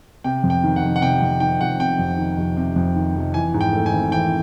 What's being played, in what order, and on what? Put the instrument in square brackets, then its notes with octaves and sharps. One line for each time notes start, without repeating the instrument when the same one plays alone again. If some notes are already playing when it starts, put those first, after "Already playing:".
[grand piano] C3 G5
F2
G5
D#3
F#5
F1
F#5
C3 G5
F2
D#3 G5
F1 F#5
C3 G5
F2
D#3
F1
C3
F2
D#3
F1
E3 G#5
G#2
G5
A3
G#5
G#1
E3 G5